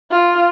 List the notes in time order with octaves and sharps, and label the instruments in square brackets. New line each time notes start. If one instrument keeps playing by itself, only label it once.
[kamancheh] F4